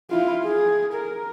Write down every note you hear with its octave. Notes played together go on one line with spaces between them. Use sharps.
E4 F4
G#4
A#4